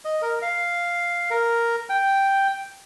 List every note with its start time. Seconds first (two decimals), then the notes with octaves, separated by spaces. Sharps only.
0.05 D#5
0.22 A#4
0.42 F5
1.30 A#4
1.90 G5